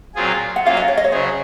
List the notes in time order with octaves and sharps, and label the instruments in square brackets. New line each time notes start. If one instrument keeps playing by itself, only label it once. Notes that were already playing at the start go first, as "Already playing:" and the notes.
[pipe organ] A#2 F#3 C4 F4 G#4
[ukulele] F#5
[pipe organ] F#3 A#3 C#4 F4 [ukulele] F5
[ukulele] D#5
C#5
D#5
C#5
[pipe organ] C#3 F#3 C#4 G#4 [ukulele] C5